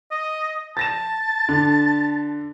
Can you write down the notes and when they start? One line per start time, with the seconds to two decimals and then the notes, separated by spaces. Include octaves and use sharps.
0.11 D#5
0.77 A5 A6 A#6 E7
1.49 D3